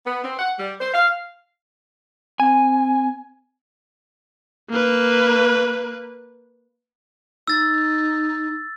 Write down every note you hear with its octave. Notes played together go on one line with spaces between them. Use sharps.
B3
C4
F#5
G3
C5
F5
C4 G#5
A#3 B4
D#4 E6 A6